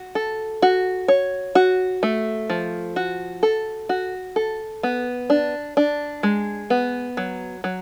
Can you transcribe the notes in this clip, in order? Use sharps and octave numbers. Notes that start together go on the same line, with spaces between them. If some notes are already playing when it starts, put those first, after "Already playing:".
Already playing: F#4
A4
F#4
C#5
F#4
A3
F3
F#4
A4
F#4
A4
B3
D4
D4
G#3
B3
F#3
F#3